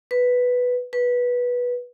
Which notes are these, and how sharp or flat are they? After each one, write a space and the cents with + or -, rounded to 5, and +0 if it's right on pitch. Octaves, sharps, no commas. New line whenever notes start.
B4 +0
B4 -15